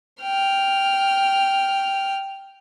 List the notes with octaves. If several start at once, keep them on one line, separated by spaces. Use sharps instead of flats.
G5 F6